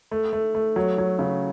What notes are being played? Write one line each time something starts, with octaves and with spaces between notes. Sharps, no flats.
A3
A3
A3
F#3
F#3
C#3